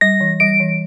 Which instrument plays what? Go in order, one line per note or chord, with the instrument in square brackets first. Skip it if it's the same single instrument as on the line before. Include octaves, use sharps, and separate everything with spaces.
[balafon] G3 [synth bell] A#6
[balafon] E3
[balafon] G3 [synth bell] D7
[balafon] E3